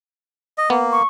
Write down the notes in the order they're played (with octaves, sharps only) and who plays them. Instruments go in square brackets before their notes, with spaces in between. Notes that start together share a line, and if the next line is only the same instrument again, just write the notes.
[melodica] D#5
[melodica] A#3 [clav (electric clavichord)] B3
[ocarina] C#6